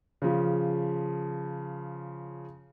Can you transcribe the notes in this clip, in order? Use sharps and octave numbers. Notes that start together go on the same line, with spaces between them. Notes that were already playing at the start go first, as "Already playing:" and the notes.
C#3 F3